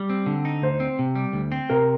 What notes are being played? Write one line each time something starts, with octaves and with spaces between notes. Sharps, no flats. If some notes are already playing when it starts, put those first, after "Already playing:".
Already playing: G3
C4
D3
D#4
D2 C5
C4
C3
G3
D2
C4
C3 A#4